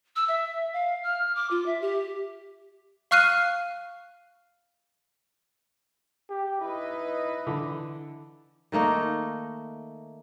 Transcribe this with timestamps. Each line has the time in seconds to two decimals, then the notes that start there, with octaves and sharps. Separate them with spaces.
0.16 E6
0.28 E5
0.73 F5
1.03 F6
1.35 D6
1.50 F4
1.66 E5
1.81 G4
3.11 F5 C#6 F6 F#6 C7 D#7
6.30 G4
6.61 D#4 E4 B4 D#5
7.47 D3 E3
8.72 D#3 A3 A#3 D#4